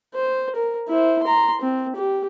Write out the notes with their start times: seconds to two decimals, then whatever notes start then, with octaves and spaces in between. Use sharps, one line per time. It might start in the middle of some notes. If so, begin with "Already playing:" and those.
0.14 C5
0.55 A#4
0.88 E4 C5
1.23 A#5 C6
1.61 C4
1.95 G4